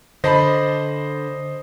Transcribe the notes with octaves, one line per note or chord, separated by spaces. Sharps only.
D3 C5 D#5 A5 B5